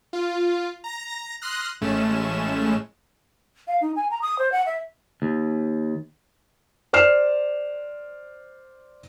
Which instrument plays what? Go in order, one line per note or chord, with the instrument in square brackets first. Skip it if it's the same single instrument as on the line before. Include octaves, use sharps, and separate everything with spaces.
[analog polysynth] F4
A#5 A#6
C6 D#6 F6 F#6 A#6
A1 A2 G#3 A3 C#4 E7
[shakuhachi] F5
D#4
G#5
A#5
D#6
C5
F#5
E5
[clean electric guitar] D#2
[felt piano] C5 D5 F6 C7 E7